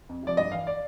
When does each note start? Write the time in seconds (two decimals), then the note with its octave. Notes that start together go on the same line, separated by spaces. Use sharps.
0.09 F2
0.23 C3 F3 D5
0.37 G2 D#5
0.52 E3 F5
0.67 D5